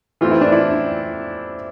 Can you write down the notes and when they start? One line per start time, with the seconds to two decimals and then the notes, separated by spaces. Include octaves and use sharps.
0.21 E3 A3 C4 F4
0.31 E4
0.41 D4
0.52 E4